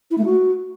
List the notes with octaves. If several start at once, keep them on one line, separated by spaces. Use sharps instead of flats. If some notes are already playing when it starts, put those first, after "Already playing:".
E4
A3
F#4